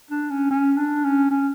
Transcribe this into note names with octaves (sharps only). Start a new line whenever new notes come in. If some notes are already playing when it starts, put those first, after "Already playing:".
D4
C#4
C#4
D4
C#4
C#4